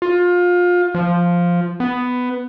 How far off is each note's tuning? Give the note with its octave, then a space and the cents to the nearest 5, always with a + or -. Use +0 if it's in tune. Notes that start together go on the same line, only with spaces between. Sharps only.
F4 +25
F3 +0
B3 +10